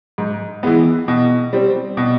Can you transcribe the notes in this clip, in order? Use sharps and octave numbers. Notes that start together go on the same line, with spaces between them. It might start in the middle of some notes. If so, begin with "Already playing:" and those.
G#2
E3 G#3 B3
B2
G3 C4
B2